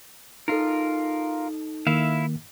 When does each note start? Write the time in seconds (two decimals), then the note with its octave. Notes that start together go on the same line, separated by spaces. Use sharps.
0.48 D#4 F4 A4 A#4
1.87 D#3 A#3 E4 E5 F5